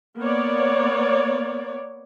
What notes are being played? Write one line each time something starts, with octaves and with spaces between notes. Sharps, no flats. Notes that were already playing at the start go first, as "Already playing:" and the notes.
A#3 B3 C#5 D5